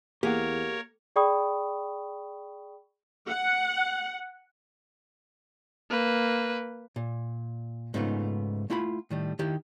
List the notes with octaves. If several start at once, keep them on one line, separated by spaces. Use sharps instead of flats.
E2 A#3 G4 G#4 A#4 C#5 F#5
G#4 D5 G5 B5 C#6 D#6
F#5
A#3 B4
A#2
G#2 C#3 A3 B3 D#4 F4
A3 E4 F4 F#5 B5
A2 D#3 G3
D#3 E4 G4